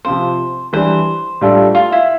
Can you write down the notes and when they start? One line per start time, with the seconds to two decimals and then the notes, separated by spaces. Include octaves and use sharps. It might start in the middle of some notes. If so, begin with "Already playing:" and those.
0.05 C3 F3 C4 F4 C5
0.73 E3 G3 D4 C5
1.41 A2 G3 D4 F4 A4
1.75 F4
1.92 E4